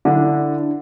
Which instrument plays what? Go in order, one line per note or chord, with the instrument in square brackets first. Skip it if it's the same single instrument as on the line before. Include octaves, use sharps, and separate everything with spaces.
[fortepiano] D3 [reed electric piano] D4 E4